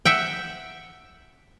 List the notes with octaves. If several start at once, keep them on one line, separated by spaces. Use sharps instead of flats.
E5 F#5 G5